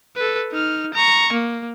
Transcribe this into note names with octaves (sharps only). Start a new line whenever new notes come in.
A4 B4
D#4 F6
A#5 C#6
A#3